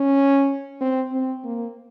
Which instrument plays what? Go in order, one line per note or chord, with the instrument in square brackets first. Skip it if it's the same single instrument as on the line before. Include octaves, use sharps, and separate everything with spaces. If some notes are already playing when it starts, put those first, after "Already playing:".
Already playing: [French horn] C#4
C4
C4
A#3